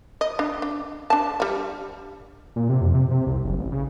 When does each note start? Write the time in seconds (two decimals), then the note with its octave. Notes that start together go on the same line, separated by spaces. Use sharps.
0.21 D#5
0.39 D4
0.62 D4
1.10 D4 A5
1.40 G3 D4
2.56 A#2
2.69 C3
2.81 F2
2.94 C3
3.11 C3
3.27 C2
3.44 F#1
3.58 A1
3.72 C#3